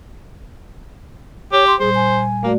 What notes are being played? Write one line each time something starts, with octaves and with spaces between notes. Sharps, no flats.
G4 C#5
C6
A#2 G3 G#4 C5
G#5
A3 A#3 F#4 D5